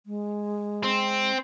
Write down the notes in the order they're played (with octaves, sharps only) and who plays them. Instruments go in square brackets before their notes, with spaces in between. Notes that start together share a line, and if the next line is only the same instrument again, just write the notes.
[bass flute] G#3
[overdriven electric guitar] C4